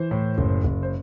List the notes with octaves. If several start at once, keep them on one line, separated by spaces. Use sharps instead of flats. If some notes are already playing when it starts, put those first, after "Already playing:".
Already playing: E3 C5
A2
F#1
F#1
C5